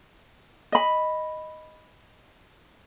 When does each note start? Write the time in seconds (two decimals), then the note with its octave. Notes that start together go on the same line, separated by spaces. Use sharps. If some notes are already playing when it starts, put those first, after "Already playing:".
0.72 D#5 B5